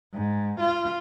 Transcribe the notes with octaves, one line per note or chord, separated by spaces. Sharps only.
G#2
F4